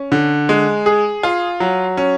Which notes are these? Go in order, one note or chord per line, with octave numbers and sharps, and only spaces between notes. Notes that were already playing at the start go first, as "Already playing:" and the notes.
Already playing: C#4
D3
G#3
G#4
F4
F#3
C#4